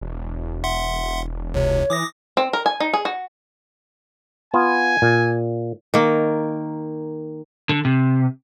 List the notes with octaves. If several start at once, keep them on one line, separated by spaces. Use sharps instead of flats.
E1
E5 F#5 C6
C#2 C3 C#5
E3 D6 D#6 A#6
C4
A#4
G#5
D#4
G#4
F#4
B3 F4 G#5
A#2
D#3 A#3
D3
C3